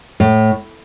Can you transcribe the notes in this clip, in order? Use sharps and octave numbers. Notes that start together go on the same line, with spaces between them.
A2